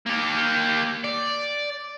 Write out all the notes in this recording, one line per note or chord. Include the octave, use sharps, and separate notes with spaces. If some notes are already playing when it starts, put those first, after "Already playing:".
A#3 G4
D5